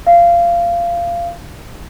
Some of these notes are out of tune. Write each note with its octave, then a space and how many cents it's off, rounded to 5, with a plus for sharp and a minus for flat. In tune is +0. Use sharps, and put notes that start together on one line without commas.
F5 -20